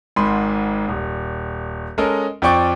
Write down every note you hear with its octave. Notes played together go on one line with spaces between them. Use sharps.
G#1 G#2 B5 C6
D#1
G#3 C#4 A4 A#4 D#5
F2 F3 D5 G5 C#6 D6